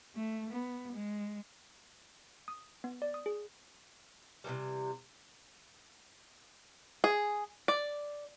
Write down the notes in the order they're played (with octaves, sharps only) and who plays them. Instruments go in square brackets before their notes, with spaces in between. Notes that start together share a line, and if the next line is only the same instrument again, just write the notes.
[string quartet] A3
B3
G#3
[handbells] D#6
B3
D5
D#6
G#4
[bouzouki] C3 D#3 E3 G3
[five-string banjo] G#4
D5